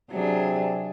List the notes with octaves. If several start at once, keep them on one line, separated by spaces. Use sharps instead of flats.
C3 F#3 D4 G#4